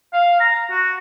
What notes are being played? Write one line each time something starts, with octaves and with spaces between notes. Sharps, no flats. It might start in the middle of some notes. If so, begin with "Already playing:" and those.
F5
A#5
F#4